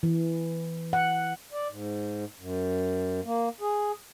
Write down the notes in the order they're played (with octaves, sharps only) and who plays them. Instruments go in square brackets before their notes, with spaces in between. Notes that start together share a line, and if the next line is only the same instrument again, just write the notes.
[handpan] E3
F#5
[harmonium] D5
G#2
F#2
A#3
G#4